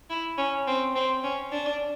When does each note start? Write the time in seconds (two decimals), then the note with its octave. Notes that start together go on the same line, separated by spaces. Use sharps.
0.10 E4
0.38 C#4
0.67 C4
0.96 C4
1.24 C#4
1.52 D4